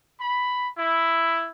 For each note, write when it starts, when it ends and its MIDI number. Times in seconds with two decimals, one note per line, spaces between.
0.19 0.69 83
0.77 1.50 64